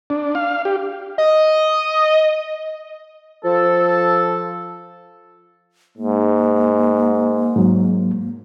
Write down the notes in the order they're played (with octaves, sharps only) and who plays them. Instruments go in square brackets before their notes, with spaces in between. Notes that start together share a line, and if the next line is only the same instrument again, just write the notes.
[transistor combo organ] D4
F5
G4
[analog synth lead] D#5
[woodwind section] F3 A4
[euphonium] G#2 [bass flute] A#3
[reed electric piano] G#2 F#3